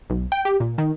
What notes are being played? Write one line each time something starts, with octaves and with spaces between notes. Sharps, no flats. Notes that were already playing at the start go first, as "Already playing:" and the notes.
B1
G5
G4
A#2
D#3